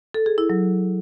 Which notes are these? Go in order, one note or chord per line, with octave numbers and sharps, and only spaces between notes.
A4
G#4
E4
F#3